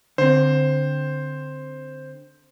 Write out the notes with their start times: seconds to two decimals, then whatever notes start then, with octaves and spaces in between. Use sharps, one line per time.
0.18 D3 C4 C5